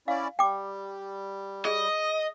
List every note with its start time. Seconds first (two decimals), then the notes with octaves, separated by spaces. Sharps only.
0.08 C#4 E4 D5 F5
0.39 G3 G5 D6
1.65 G#4 D#5